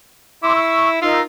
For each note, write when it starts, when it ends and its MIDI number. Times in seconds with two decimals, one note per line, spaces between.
0.43 0.97 64
0.43 0.53 84
0.43 0.53 86
0.43 0.53 88
0.55 0.87 85
0.55 0.87 88
1.02 1.21 63
1.02 1.20 65
1.02 1.21 70
1.02 1.21 88